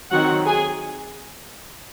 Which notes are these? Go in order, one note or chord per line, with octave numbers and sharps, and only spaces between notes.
D#3 F#3 C4 D#4 F#4 F#5
G#4 G#5